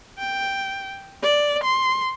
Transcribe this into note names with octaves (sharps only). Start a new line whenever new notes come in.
G5
D5
C6